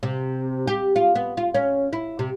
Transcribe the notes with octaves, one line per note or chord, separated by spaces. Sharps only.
C3
G4
F4
B3
F4
C#4
E4
C3